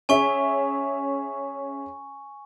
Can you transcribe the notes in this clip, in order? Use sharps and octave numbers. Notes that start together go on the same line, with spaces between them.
C#4 G#4 E5 G#5 C#6